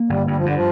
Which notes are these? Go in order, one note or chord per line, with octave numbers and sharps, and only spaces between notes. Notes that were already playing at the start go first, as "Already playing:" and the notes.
Already playing: A#3
G1 G3
G2 G3
F3
G2 D3
F3